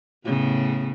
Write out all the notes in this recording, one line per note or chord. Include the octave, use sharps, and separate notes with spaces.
A2 C#3 B3